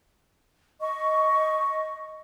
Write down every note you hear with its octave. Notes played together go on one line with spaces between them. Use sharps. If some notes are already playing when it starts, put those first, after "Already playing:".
D#5 C#6